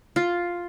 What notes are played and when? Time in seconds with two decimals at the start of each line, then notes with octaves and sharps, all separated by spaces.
0.16 F4